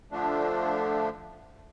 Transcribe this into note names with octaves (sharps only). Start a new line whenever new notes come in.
D3 F3 A3 D4